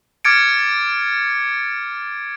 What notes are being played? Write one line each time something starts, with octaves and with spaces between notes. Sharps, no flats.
D6 F6 G#6 A6 C#7 D7